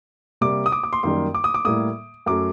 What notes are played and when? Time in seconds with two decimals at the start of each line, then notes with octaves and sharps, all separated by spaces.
0.41 C3 G3 A#3 D6
0.66 D#6
0.72 D6
0.84 D6
0.93 C6
1.03 F#2 D#3 G3 A#3 C6
1.34 D6
1.44 D#6
1.54 D6
1.65 A2 G3 A#3 D#6
2.26 F#2 F#3 A3 D6